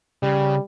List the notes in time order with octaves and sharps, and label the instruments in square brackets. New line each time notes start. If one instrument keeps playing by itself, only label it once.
[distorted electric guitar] C#3 [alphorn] G3